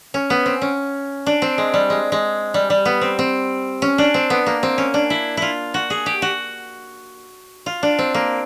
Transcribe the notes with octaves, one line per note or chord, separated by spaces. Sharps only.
C#4
B3
C4
C#4
D4
C4
G#3
G3
G#3
G#3
G3
G3
B3
C4
C4
C#4
D4
C4
B3
A#3
C4
C#4
D4
E4
E4 F4
F#4
G#4
G4
F#4
F4
D4
C4
A#3